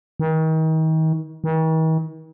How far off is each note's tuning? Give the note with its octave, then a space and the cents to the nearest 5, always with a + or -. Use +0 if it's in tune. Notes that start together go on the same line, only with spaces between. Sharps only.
D#3 +35
D#3 +45